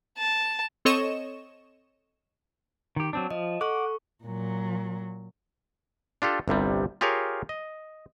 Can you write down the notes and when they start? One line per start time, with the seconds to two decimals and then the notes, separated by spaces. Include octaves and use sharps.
0.18 A5
0.85 C4 A4 C#5 D#5 C#6 E7
2.96 D#3 G4
3.13 F#3 C4 D4
3.31 F3 D#5
3.61 A4 F#5 C#6 D6
4.24 A#2 F#3
6.22 D4 F4 G4 A4
6.48 G1 C2 C3 G3
7.01 F4 G4 G#4 A#4 C#5 F5
7.49 D#5